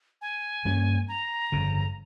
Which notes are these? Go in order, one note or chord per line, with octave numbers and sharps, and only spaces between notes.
G#5
G2 G3 A#3 C#4
A#5
G1 F2 C#3